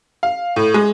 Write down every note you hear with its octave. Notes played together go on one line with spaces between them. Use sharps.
F5
A2
G#3